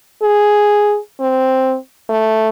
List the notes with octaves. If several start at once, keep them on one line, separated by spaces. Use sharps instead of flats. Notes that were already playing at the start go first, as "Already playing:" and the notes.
G#4
C4
A3